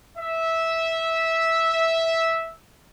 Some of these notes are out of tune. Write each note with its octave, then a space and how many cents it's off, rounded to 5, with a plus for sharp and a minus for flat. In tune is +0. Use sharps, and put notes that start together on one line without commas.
E5 -10